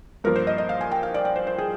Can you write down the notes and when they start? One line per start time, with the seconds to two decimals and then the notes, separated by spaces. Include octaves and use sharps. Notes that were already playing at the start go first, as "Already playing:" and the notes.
0.24 G2 F3 A#3 A#4
0.36 C5
0.47 D#5
0.58 D#5
0.69 F5
0.81 G#5
0.91 G5
1.03 F5
1.14 D5
1.25 D5
1.36 C5
1.47 C5
1.58 G#4